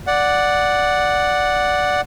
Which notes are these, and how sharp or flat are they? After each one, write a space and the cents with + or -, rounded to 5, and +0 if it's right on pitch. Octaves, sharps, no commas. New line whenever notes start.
D5 +0 F#5 +0